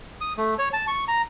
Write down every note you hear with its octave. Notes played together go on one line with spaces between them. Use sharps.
D#6
A3
C#5
A5
C#6
A#5